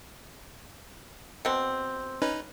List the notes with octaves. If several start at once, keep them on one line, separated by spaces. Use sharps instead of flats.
B2 C4
C#4 D#4 B4